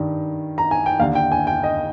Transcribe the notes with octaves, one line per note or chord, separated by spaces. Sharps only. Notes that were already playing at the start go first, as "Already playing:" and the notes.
Already playing: G2 D#3
A#5
G#5
G5
D#2 D3 F5
G5
G#5
G5
D#5